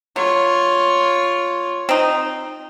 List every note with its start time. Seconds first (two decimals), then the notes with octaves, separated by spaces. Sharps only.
0.16 F#3 F4 C#5
1.89 C4 D#4